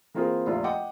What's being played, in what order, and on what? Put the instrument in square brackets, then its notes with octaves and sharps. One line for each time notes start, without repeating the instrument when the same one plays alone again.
[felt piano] E3 A#3 C4 F4 G#4 A#4
F1 A#1 E4 F4
D#5 F#5 G5 D6